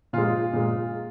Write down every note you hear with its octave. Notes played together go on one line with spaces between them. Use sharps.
A#2 G#3 F4
A#2 G#3